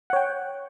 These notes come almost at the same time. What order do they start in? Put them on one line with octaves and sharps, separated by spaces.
F#5 C#5 G5